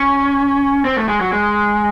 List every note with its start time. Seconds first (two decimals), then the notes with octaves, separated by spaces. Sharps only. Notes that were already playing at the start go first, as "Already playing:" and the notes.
Already playing: C#4
0.85 C4
0.97 A3
1.08 G#3
1.21 F#3
1.33 G#3